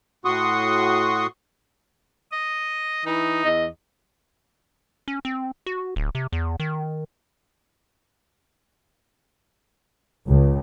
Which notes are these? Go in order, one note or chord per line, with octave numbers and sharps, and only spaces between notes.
A2 F#4 C6 C#6 D#6
D#5
E3 D#4
E2 D#5
C#4
C4
F#4
D1
C3
E2
D#3
C#2